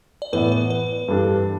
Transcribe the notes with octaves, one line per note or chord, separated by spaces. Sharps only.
D5
A2 E3 B3 E4 B4
B4
B4
G2 E3 G3 D4 A4